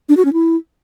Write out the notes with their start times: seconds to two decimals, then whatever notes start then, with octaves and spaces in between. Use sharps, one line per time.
0.09 D4
0.17 F#4
0.25 C#4
0.33 E4